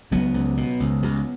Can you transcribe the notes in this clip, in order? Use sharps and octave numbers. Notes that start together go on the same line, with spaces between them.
C#2 F#3 B3
C#2
B2
C#2
C#2